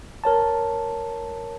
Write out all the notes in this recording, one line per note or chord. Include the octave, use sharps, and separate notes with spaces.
A#4 C#5 A5